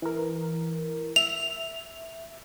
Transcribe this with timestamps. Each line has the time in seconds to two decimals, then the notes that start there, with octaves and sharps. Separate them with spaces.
0.02 E3 A#4
1.16 E5 F7